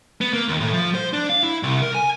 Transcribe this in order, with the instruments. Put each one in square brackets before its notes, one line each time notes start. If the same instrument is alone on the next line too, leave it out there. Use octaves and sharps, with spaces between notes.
[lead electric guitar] B3
A#3
D#2
A2
F3
C5
D4
F5
E4
C2
A#4
G#5